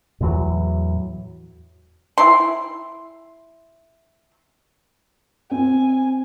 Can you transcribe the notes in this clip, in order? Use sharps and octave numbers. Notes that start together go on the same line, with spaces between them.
E2 A2 E3 F#3
E4 C6
C4 G#5